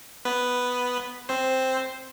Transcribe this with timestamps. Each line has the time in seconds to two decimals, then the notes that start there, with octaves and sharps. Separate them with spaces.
0.25 B3 B4
1.29 C4 C5